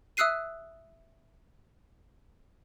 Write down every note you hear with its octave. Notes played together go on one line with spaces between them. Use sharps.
E5 D#6 E6 F#6 C7 D#7